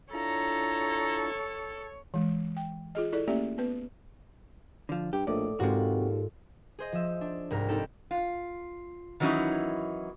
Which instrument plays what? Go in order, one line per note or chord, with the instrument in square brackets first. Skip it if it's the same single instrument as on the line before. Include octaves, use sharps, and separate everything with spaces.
[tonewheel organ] D4 E4 F4 [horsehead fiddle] A4 [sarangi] C#5 [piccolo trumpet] A#5
[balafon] E3 G#3
G5
F4 G#4 D#5
E4 A4 D5
A3 A#3 C#4 G4 D5 E5
B3 B4
[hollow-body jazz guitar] D3 F3
[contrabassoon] G2 [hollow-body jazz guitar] G4
[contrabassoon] A#1 [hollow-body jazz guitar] A2 [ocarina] A4 [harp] D5 D#5
[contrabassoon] D#2 [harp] G#2 G#3 F4 [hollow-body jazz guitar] C3 F#4
[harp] G#4 C5 D#5
F3 E5
D4
C2 G#2 A#4
C4 D#4 G4 A4
[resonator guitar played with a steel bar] F4
D#3 E3 F#3 C#4 D#4 E4